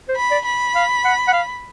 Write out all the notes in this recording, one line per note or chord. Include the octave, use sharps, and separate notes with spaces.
C5
B5
D5
B5
F5
F#5
F#5
F5